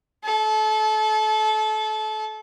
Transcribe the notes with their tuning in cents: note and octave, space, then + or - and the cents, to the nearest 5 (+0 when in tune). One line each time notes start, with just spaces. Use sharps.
A4 -30